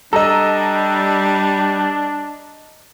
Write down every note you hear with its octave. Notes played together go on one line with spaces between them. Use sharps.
G3 D4 A4 D#5 A#5